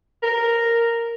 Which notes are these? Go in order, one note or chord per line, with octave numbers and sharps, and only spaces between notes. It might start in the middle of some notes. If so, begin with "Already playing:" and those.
A#4